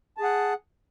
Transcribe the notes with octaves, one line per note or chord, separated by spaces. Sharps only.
G#4 F#5 A5